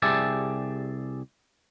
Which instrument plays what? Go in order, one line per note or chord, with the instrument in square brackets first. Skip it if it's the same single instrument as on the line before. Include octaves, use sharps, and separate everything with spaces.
[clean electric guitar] C2 G4 G#4 D5 E5 A5